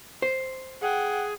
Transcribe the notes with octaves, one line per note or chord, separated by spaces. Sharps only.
C5
G#4 F#5 G5